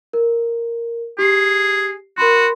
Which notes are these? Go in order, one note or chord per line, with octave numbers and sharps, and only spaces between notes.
A#4
G4 G#4 C7
F#4 A#4 B5 C6